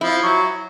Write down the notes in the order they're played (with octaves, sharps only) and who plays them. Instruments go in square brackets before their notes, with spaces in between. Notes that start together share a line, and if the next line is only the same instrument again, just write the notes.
[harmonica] F3 [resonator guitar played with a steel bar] E4
[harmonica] F#3